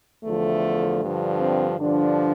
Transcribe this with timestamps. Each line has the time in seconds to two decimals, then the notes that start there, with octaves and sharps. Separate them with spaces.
0.24 E2 D3 F3 A3
1.01 G2 D3 F3
1.40 C4
1.79 G2 D3 F3 D4